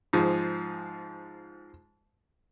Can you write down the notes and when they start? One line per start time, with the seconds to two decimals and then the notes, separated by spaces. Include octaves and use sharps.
0.13 G#2 F3 G#4